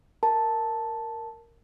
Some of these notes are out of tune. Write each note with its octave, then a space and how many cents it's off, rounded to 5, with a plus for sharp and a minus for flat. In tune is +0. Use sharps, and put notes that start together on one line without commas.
A#4 -5 A5 +0